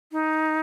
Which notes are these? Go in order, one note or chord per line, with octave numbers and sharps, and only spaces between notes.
D#4